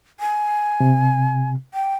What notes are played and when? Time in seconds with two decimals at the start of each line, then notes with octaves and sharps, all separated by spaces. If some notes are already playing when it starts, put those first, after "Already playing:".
0.20 G#5
0.80 C3
1.74 G5